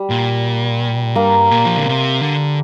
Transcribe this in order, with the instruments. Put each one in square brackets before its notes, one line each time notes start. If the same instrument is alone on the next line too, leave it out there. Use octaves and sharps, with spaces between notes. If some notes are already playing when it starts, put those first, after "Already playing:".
Already playing: [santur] G3
[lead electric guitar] A#2
[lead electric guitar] G2 [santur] A#3
[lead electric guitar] A#2
F3
D3
C3
D3